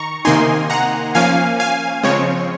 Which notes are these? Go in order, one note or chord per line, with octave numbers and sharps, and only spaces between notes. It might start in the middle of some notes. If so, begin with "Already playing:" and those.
Already playing: D#3 A#5 C#6
C3 D#3 A#3 D#4 G#5 C6
F#5 A#5
F3 A#3 C#4 F5 G#5
F5 G#5
C#3 F3 G#3 C4 C#5